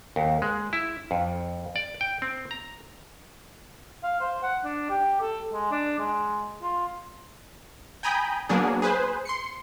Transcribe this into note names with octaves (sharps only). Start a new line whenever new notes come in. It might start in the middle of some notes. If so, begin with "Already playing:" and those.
D#2
G#3
E4
F2
D5
G5
C4
A#5
F5
C5
F#5
D4
G4
A4
G#3
D4
G#3
F4
G5 G#5 A#5 B5 D#6 G6
F#3 A#3 B3 D4 G#4
G#4 B4 C5
C6 C7 C#7